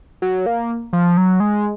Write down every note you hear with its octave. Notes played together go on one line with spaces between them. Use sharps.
F#3
A#3
F3
F#3
G#3